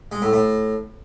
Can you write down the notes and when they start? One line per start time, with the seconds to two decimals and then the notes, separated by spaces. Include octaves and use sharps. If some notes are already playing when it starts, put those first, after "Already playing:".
0.12 G#3
0.22 A2
0.33 A2